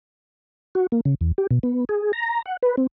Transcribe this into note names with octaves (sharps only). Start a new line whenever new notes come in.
F#4
A#3
C#3
E2
G4
B2
B3
G#4
A#5
F#5
B4
C4